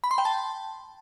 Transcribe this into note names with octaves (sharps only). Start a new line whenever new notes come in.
B5
C6
G5
A5